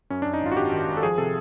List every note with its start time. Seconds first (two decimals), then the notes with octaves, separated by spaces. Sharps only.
0.10 F#2 C#4
0.22 D4
0.26 F#2
0.34 D#4
0.41 G#1 F4
0.52 F#4
0.57 G#1 G4
0.73 D#3
0.88 G#1
0.97 A4
1.03 F3 G#4
1.18 C3 A4